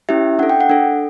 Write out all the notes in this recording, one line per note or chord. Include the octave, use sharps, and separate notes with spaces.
C#4 E4 G4 E5
D4 A4 F#5
G5
F#5
D4 A4